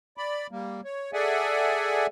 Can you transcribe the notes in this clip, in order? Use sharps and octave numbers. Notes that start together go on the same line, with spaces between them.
D5 B5
G3 A#3
C#5
G#4 A4 D5 E5 F#5 G#5